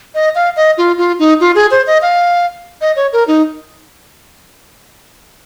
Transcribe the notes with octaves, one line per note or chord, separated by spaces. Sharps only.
D#5
F5
D#5
F4
F4
D#4
F4
G#4
C5
D#5
F5
D#5
C#5
A#4
D#4